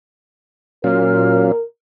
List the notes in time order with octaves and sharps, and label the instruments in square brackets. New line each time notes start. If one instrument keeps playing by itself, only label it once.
[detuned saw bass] A#2 [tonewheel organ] F#3 C#4 F5 [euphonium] A#4